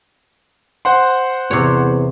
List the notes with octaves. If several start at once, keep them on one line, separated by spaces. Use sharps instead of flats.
C5 F#5 C6
E2 C3 C#5